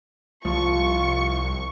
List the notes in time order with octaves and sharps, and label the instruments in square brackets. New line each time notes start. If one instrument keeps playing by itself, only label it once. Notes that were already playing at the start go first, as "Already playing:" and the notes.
[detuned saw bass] C2 [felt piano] F3 [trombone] F4 [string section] C#6